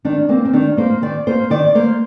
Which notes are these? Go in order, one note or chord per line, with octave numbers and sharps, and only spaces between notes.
D#3 D4
A#3 C4
C4
D#3 D4
A#3 C5
D#3 D5
A#3 C5
D#3 D5
A#3 C5